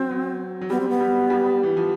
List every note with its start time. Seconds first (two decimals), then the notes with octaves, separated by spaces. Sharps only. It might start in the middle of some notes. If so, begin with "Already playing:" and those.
Already playing: F#3 C4
0.11 F#3
0.61 F#3
0.70 G3 B3
0.80 C4
0.89 B3
1.00 G3
1.30 G3
1.63 E3
1.77 F3